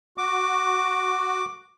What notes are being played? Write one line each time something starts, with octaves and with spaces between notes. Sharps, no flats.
F#4 D6